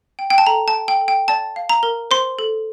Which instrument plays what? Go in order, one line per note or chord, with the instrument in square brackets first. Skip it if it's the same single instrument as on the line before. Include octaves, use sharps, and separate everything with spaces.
[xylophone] G5
G5
A5
A4 A#5
A5
G5
G5
A4
G5
D5 A5
F5
A#5
A#4
C5 C6
A4